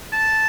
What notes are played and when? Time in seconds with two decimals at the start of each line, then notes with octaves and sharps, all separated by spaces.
0.13 A5